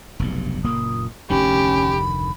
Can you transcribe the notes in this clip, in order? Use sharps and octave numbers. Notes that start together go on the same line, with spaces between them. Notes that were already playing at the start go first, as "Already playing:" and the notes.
F1 B1 G2
F#1 A#2 A#3 D#6
F1 D2 D#3 C#4 G4 B5